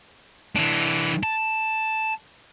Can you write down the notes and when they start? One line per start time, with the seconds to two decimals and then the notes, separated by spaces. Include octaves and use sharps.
0.56 E3 D4
1.23 A5